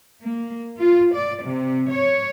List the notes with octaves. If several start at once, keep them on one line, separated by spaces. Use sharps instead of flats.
A#3
F4
D5
C3
C#5